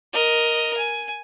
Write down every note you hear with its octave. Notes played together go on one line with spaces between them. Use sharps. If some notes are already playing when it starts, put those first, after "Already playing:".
A#4 D#5
G#5